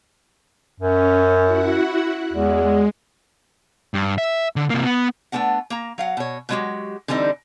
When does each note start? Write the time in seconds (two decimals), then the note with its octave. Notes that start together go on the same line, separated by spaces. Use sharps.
0.80 F#2 C#4
1.43 E4 F#4 F#5
2.33 E2 G#3
3.94 G2
4.18 E5
4.56 D3
4.70 C3 A#3
4.84 B3
5.32 A3 B3 C4 D4 F#5
5.70 A#3 A#5
5.98 F#3 F5 F#5
6.17 B2 C#5
6.49 B2 F#3 G#3 D#4 F#4 G4
7.08 D3 E3 G3 C4 D#4